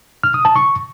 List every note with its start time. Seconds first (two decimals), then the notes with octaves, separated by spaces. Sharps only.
0.23 F6
0.34 D#6
0.45 A5
0.56 C#6